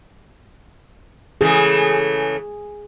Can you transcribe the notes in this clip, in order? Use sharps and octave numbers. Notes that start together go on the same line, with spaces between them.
C#3 E3 A3 G#4